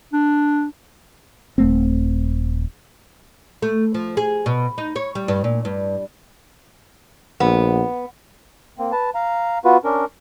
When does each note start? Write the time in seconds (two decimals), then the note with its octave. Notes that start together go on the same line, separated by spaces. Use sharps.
0.13 D4
1.58 D#1 A3 C4
3.62 A3
3.94 F3
4.17 G#4
4.46 B2
4.78 D#4
4.96 C#5
5.15 G3
5.28 G2
5.44 A#2
5.65 G2
7.40 A#1 B3
8.79 A#3 C4
8.92 B4 A5
9.15 F5 A#5
9.65 B3 F4 F#4 B4
9.84 C#4 D4 A#4